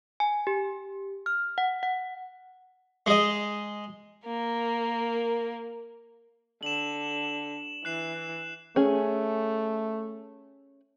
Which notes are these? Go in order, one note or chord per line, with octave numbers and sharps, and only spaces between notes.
G#5
G4
F6
F#5
F#5
G#3 D#5
A#3 A#4
D3 E7 F#7
E3 F#6 C7 E7
A3 C#4 G#4